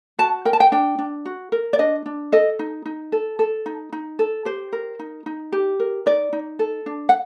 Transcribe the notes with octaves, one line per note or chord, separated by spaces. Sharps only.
F#4 A5
A#4 G5
A5
G5
D4 G5
D4
F#4
A#4
D5
D4 D#5
D4
A4 D#5
D#4
D#4
A4
A4
D#4
D#4
A4
G4 C5
A#4
D#4
D#4
G4
A#4
D#4 D5
D#4
A4
D4
F#5